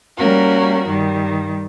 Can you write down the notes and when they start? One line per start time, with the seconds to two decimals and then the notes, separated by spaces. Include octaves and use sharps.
0.16 G3 A#3 C#4 F#4 A#4
0.84 G2 D#3 G3